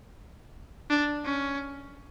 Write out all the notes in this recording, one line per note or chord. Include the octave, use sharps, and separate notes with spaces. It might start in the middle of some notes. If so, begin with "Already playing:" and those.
D4
C#4